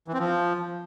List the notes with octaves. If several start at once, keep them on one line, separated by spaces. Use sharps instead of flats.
E3
C4
F3